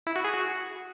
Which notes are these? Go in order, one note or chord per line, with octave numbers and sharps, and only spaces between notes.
E4
F#4
G#4
F#4